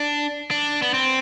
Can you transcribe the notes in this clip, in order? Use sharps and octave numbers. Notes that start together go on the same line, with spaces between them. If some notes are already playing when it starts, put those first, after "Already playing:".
Already playing: D4
D4
B3
C4